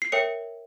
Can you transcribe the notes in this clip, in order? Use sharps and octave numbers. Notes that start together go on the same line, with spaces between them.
C7
A#4 C#5 E5 G5 C#7